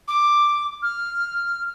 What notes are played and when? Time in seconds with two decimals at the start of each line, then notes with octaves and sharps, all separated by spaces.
0.08 D6
0.82 F6